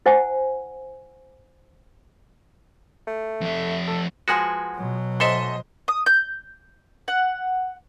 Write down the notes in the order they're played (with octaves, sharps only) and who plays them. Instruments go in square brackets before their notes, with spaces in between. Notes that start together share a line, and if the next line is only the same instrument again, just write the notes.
[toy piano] E4 C5 F#5 G#5
[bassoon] A3
[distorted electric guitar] F2 E5
[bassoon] A4
[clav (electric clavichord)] F3 G#3 F#4 [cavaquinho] B4 F#5 G#5
[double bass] B2 F#3
[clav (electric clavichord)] G#2 A4 E5 [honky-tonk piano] C5 D#5 [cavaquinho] C6
[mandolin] D#6
G6
F#5